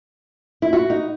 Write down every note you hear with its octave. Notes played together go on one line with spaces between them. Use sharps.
E4
F#4
D#4